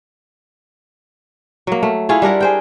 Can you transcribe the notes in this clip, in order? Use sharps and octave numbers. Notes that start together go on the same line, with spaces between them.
F#3 A#3
A3
E4 F4 G#4 C#5
G3 D4 A#4 F#5
G#4 C5 G5